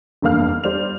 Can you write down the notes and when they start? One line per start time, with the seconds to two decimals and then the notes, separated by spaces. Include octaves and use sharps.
0.22 F1 E2 G2 A#3 F5 F6
0.64 G3 C5 D5 F7